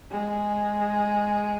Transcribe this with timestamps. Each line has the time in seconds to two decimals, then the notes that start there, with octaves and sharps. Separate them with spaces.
0.12 G#3